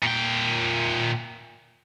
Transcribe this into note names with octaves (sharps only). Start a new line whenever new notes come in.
A#2 G5